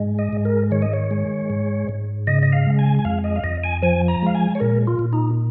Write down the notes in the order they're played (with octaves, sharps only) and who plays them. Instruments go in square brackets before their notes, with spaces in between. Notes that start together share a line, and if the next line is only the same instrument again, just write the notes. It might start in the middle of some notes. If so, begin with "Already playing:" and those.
Already playing: [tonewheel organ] G#2 G#3
D#5
G#2
A#4
D#3 C#5
D#5
C#5
G#3
G#2
G#2
C#3 D#5
D#5
F5
G#3
G#5
G#5
F2 F5
D#5
F5
F2 D#5
G#5
F3 G#5
A#5
G#3 F5
G#5
C#5
A#2 A#4
F4
A#2
D#4